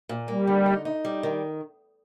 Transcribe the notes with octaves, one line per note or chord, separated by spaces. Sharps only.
A#2
G3 A#3
D3
D#4
D#4
G3
D#3